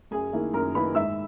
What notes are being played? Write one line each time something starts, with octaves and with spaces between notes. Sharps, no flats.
F#2 G#4 G#5
D#3 A#3 E4
F#2 A#4 A#5
D#3 A#3 E4 B4 B5
G#2 E5 E6